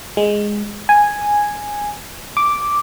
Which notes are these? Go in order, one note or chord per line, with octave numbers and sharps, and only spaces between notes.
G#3
G#5
D6